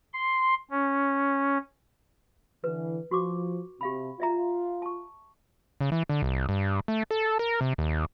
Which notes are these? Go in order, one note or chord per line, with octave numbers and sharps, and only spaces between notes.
C6
C#4
D3 E3 B4
F3 F#4 C#6 D6
C3 G4 F5 B5
F4 D5 E5 A#5
A5 C#6
C#3
E3
D3
C2
G2
A3
A4
A#4
C3
D#2